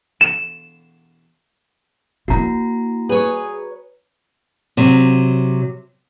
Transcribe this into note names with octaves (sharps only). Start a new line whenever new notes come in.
E7
A#3 E4 F#4 A#5
G#4 B4 C#5
C3 F#3